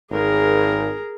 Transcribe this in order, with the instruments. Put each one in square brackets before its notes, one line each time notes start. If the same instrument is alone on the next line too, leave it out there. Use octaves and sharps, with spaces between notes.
[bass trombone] G#1 [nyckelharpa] G#4 A#4